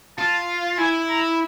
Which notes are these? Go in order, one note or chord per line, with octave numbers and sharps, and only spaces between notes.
F4 A5
E4 G#5
A#5